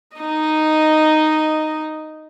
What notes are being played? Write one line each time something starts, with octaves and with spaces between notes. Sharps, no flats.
D#4 D#5